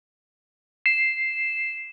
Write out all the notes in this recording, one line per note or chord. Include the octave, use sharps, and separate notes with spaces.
C7 E7